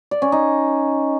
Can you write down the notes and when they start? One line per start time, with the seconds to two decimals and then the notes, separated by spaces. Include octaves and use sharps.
0.11 D5
0.22 C#4
0.32 D#4